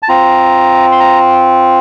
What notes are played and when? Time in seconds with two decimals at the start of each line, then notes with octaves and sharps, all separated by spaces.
0.03 A5
0.09 C4 F4 A#5
0.92 C6
1.00 A#5